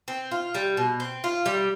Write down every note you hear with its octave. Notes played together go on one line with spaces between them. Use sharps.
C4
F4
G3
B2
C4
F4
G3